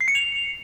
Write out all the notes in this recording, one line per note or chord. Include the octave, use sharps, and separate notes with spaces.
C7
C#7
F7